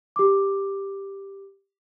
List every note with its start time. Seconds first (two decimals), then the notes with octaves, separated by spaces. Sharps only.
0.16 G4 D6